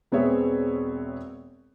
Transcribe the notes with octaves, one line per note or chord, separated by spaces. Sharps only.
E1 B3 C4 G#4 C#5 E5